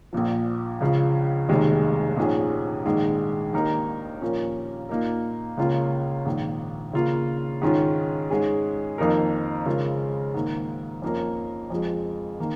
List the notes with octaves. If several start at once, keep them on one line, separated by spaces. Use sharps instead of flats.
A#1 A#2 F3
C#2 C#3 F3
F1 D#2 D#3 G#3
A#1 G#2 F3 C#4 G#4
A#1 G#2 D#3 G#3
D#2 D#3 A#3 D#4 A#4
A#2 F3 C#4 A#4
A#2 A#3 D#4 A#4
C#2 C#3 A#3 C#4 F4
A#1 G#2 D#3
C#3 A#3 F4
G#2 D#3 G#3 C#4 F4
G#2 G#3 C#4 G#4
F2 D#3 A#3 D#4 A#4
C#3 G#3 C#4 F4 A#4
G#2 D#3 A#3
F2 F3 A#3 C#4 A#4
F2 F3 G#3
D#3 A#3